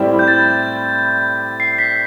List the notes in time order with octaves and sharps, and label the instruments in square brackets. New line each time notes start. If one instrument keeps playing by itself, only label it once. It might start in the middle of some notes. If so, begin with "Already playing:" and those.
Already playing: [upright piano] A2 G3 C4 E4 G4
[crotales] G6
A6
C7
B6